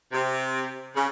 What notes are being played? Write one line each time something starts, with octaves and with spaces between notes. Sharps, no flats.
C3
C#3